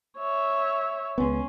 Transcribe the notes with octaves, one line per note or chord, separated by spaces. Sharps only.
C#5 E5
C#2 B3 C#4 C6